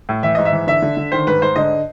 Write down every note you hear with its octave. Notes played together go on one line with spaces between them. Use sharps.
A2
E3 E5
G#2 D#5
E5
E3
D3 E5
D3
D3
D#3 C5
G#2 B4
G#2 C5
D3 D#5